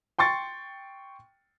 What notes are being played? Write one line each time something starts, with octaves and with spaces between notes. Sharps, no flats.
G5 C6 C#6 A6 C#7